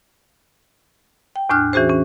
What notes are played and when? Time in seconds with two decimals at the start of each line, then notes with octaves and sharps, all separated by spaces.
1.36 G5
1.49 E2 A2 D4 F6 F#6
1.73 E3 C#4 F#4 G#4 C5
1.89 E3 C#4